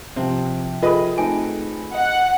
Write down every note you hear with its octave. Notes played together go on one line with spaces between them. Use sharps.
C3 F3 C4
F4 G#4 A4 B4 D#5
A3 C4 D#4 G#5
D#5 F#5